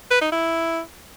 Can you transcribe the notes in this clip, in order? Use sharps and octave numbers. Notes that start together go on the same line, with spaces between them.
B4
D#4
E4